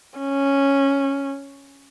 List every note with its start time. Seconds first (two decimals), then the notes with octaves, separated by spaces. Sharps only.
0.19 C#4